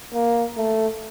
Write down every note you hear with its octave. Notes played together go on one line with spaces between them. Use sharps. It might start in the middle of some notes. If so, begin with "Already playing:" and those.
A#3
A3